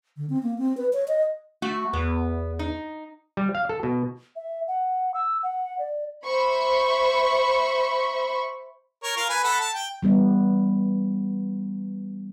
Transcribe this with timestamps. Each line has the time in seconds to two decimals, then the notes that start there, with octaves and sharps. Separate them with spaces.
0.17 D3
0.30 C4
0.43 A#3
0.58 C4
0.77 B4
0.93 C#5
1.08 D#5
1.62 A3 F#4
1.93 E2 B3
2.59 D#4
3.37 G3
3.55 F5
3.69 A4
3.83 B2
4.36 E5
4.67 F#5
5.14 E6
5.43 F#5
5.79 D5
6.26 C5 E5 B5 C#6
9.03 A#4 C#5
9.17 F4 A#4 F5
9.29 B4 G#5
9.44 A4 F#5 B5
9.61 A5
9.74 G5
10.02 E3 G3 B3